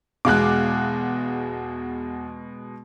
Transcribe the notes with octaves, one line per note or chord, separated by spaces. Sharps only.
E2 B2 G#3 F5 D6 F#6